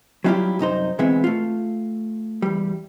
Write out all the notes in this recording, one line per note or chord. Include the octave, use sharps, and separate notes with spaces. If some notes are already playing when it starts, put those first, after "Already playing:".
F#3 G3 D4 E4 F4 G4
C2 F#2 D#4 C5
B2 E3 G#3 B3 C4 E5
A3 F4
E2 G3